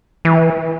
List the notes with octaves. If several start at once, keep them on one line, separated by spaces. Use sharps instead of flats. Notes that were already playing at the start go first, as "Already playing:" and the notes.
E3